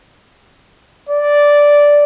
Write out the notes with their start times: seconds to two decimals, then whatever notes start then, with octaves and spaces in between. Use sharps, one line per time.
1.09 D5